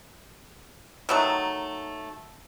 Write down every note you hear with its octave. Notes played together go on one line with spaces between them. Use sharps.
D#3 F#3 A3